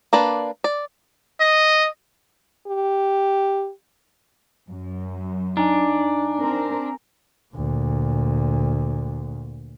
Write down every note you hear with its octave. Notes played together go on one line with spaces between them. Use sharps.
A#3 D4 B4 D5
D5
D#5
G4
F#2
D4 D#4 G#5 A#5
C4 A#4
D2 A#2